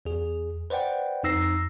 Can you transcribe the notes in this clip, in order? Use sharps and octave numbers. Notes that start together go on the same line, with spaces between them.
E2 G#4
B4 C5 D5 F#5 G5
F2 D#4 E6 A#6 C7